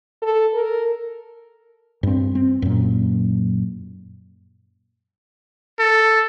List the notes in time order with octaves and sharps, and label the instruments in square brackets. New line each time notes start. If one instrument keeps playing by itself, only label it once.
[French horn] A4
A#4
[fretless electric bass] G2 C4
C4
F#2 A#2
[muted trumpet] A4